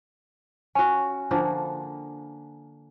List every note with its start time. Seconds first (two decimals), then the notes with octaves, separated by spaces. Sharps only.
0.75 C#4 F#4 G#5
1.31 D3 F3 A#3